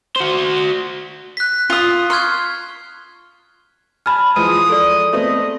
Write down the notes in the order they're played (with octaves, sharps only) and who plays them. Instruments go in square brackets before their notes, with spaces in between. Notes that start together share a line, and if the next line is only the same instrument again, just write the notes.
[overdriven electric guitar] F#4 C5
[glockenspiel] F#6 B6
[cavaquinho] F4 D#6
[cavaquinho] C6 [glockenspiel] C#6 F6 G#6
[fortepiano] G#5 A5 [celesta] B5 F6
[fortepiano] E3 F3 G#3 [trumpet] D#6 [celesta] D#7
[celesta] A4 D5
[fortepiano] A3 B3 C4 [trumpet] D#5